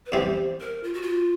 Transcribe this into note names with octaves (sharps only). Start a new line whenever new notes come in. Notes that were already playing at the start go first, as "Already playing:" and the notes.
B4
E2 C3 E3 G3 C4 C5
A#4
F4
F#4
F4